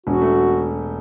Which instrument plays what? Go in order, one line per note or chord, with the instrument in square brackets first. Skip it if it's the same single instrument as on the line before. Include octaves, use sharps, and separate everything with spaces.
[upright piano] E1 [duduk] F#4
[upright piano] A3